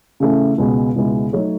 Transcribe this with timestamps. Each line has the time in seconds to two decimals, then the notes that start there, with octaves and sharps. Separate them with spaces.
0.20 C#3 E3 A3 C#4
0.58 C#2 B2 G#3 B3
0.96 C#2 B2 G#3 B3 E4
1.33 F#3 A3 D#4 A4 C#5